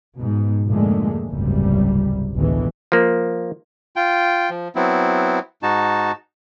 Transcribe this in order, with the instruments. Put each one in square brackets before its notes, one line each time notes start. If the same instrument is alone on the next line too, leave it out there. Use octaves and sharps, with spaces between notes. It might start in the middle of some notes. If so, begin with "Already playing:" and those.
[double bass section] G#2 B2
F2 A#2 D3 G#3 A3
F#1 C#2 G#2 C3 G3
A1 D2 B2 D#3 E3 G#3
[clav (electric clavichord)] F3 A#3
[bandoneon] F4 G5
F3
F#3 B3 C4 E4
G#2 D#4 F#4 A5